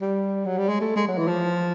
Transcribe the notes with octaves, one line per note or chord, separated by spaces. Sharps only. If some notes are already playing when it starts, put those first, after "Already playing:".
G3
F#3
G3
G#3
A3
G#3
F#3
E3
F3